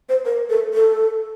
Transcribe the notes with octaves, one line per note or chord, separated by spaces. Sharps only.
C5
A#4
A4
A4